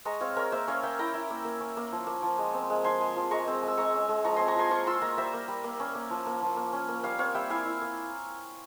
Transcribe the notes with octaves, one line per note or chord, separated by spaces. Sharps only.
G#3 A#5 C#6
C4 C#5 F5
G#3 A#4 C#5
A#3 C5 E5
C#4 C#5 F5
A#3 E5 G5
E4 G5 A#5
E4
A#3
A#3
C#4
A#3
F3
A#3
F3
G#3
C4
G#3
F3 G#5 C6
G#3
F3
G#3 A#5 C#6
C4
G#3 E6
G#3 A#5 C#6
C#4
G#3
F3 A#5 C#6
C4 G#5 C6
A#5 C#6
F3 G#5 C6
F4 A#5 C#6
F4 C6 E6
A#3 A#5 C#6
G3 C5 E5
A#3
G3
A#3
C#4
A#3
F3
A#3
F3
A#3
C#4
A#3
G3 C#5 F5
C4 C#5 F5
G3 E5 G5
E4 F5 G#5
E4
A#3